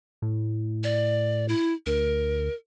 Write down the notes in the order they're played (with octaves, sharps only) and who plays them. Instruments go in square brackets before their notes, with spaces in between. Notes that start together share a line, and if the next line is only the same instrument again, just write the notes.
[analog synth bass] A2
[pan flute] D5
E4
[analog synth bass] D2 [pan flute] A#4